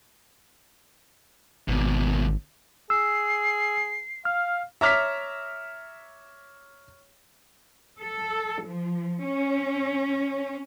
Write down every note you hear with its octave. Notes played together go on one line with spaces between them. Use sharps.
G#1 D#2 B2
G#4 E6 C7
F5 F6
C#5 E5 A#5 D6 F6 B6
A4
F3
C#4